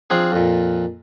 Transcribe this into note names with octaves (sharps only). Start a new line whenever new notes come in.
F3 C4 D4 G#4
F2 A#2